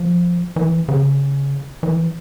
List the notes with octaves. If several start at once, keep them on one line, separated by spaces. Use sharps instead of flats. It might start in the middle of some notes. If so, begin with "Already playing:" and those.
Already playing: F3
E3
C#3
E3